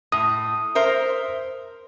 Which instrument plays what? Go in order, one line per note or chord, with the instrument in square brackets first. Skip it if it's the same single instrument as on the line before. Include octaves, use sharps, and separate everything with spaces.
[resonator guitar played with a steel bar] A2 [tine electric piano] D#6
[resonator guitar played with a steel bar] A#4 C5 E5